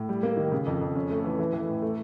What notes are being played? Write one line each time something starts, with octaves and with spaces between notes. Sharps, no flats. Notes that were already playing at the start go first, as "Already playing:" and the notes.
Already playing: A2
G3
A#3
D#3
C#3
F2
F2
C#4
A3
E3
E3
E3
A2
A3